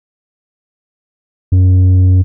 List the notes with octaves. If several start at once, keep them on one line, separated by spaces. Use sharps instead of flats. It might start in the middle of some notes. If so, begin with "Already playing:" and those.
F#2